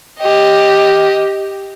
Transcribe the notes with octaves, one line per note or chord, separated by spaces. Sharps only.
G4 D#5